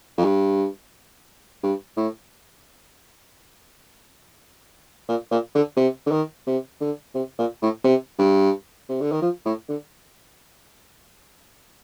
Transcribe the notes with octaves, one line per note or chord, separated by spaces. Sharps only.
F2
G2
G2
A2
A#2
A#2
D3
C3
D3
D#3
C3
D3
C3
A#2
A2
C3
G2
C3
D3
D#3
F3
A2
D3